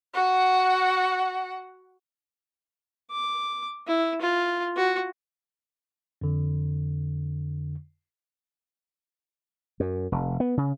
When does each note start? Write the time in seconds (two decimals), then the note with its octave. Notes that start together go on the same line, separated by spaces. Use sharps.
0.14 F#4 F#5
3.11 D6
3.87 E4
4.21 F4
4.76 F#4
6.21 F2 D3
9.80 F#2
10.12 F1
10.40 B3
10.57 C#3